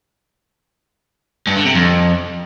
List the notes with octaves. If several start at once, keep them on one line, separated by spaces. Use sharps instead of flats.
G2
D3
C3
F2